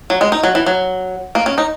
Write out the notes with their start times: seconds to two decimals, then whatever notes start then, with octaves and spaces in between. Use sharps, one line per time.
0.10 F#3
0.21 G#3
0.32 D#4
0.43 F#3
0.55 E3
0.66 F#3
1.35 A#3
1.46 C#4
1.58 D#4